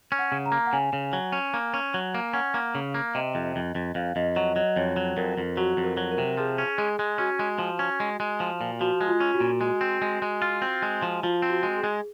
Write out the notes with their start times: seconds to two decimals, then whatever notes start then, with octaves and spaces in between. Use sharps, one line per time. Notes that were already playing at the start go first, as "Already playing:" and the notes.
0.12 C#4
0.19 F#5
0.32 C#3
0.46 A#5
0.52 A#3
0.66 F#5
0.73 C#3 G#5
0.93 C#3
1.13 F#3
1.32 C#4
1.54 A#3
1.74 C#4
1.94 F#3
2.14 A#3
2.33 C#4 F#5
2.54 A#3
2.75 C#3 F5
2.94 A#3
3.15 C3 D#5
3.35 F2
3.56 F2
3.75 F2
3.95 F2 F5
4.16 F2 D#5
4.36 F#3 D#5
4.56 F#3 D#5
4.76 F2 C#5
4.96 F#3
5.17 F2 A#4
5.37 F2
5.57 F#3 F#4
5.77 F2
5.84 A#4
5.97 F#3
6.11 A#4
6.18 C3
6.37 F3 G#4
6.58 C#4
6.78 G#3 G#4
6.99 G#3
7.18 C#4 F#4
7.39 G#3
7.59 F3
7.79 C#4
8.00 G#3
8.20 G#3
8.40 F3
8.61 A#2
8.80 F3 F#4
9.01 G#3
9.08 F4
9.20 C#4
9.34 F#4
9.40 A#2
9.61 G#3 F#4
9.81 C4
10.02 G#3
10.22 G#3
10.42 F4
10.62 C4
10.82 G#3
11.02 F3
11.23 F3 F4
11.42 C4
11.50 F#4
11.63 G#3
11.76 G#4
11.84 G#3